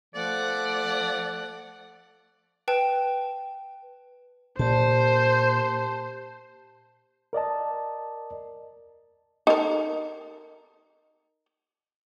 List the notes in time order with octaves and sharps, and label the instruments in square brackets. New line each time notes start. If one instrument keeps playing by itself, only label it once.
[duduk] F3 [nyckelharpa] A3 F#5 [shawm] D5
[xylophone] B4 G5 A5
[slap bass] A#2 [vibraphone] G4 A5 [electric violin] C5
[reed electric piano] A#4 D5 D#5 A5
[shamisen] D#4 A4 A#4